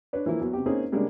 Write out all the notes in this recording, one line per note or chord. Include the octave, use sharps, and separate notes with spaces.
D4 B4 C#5
E3 F3 A#3 E4
E2 F#3
C3 G4
A#3 C4 C#4 D#4 G#4
C3 G3 G#3 A#3 C#4 D4